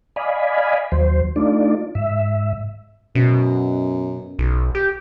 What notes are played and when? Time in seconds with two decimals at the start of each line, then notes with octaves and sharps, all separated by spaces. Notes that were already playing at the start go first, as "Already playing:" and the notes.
0.16 D5 D#5 F5 G#5 B5
0.92 D#2 F#3 C5
1.36 A3 D4 D#4 F4 D5
1.95 G#2 E5
3.15 F#2 B2
4.39 B1
4.75 G4